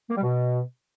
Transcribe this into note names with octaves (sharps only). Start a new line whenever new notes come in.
A#3
G3
B2